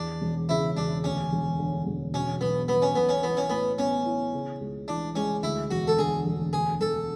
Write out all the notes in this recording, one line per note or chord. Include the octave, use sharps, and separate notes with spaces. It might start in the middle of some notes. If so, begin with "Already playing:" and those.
Already playing: E2 D4
E1
C#3 E4
E1 D4
D2 C#4
E1
D3
E1
B2 C#4
B1 B3
F#3 B3
C#4
B1 B3
C#4
E3 B3
C#4
A2 B3
B3 C#4
E4
C#3
C#2
E3 D4
G#3 C#4
D2 E4
E1 F#4
A4
D3 G#4
E1
D2 G#4
E1 A4